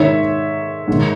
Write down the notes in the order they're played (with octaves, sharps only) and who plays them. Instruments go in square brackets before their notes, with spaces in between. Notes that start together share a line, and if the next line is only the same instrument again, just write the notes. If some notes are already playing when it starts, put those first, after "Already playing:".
Already playing: [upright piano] G#2 D#3 C#5 E5
G#2 D#3